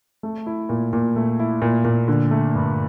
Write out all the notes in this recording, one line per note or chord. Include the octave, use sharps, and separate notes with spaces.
A3
E4
A#2
A#2
A3
E4
A#2
A#2
D3
A3
G2